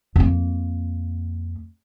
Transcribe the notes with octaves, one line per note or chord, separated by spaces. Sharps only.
F2 A#3